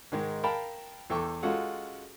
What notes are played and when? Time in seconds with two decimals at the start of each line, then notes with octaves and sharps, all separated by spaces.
0.12 G#2 D#3 G#3
0.43 A#4 F5 G5 A5 B5
1.10 E2 A4 G5 C#6 D6
1.43 G#3 C#4 F4 F#4 A4 F#5